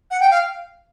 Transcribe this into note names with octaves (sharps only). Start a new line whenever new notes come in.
F#5
G5
F5